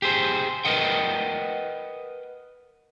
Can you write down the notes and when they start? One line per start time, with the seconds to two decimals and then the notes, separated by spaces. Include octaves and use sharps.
0.02 G4 G#4 C5
0.65 A#4 B4 D#5 F#5 G5